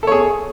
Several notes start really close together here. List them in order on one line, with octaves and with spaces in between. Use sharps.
A4 C#5 G#4